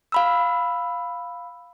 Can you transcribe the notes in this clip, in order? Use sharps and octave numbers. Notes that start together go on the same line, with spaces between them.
F5 B5 E6